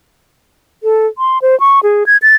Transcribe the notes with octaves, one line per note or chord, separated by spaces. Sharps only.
A4
C6
C5
C#6
G#4
G#6
A6